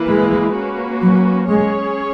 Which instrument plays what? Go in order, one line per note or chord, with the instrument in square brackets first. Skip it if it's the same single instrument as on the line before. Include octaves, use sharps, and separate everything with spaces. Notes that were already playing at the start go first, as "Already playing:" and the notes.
Already playing: [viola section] E3 A#3 E4 B4
[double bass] G#3
[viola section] A#3 C#4 F#4 B4
[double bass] F#3
[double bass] G#3 [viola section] C#4 G#4 C#5